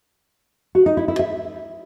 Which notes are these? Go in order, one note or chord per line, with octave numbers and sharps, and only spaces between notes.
F#4
D#4
E4
E4
E5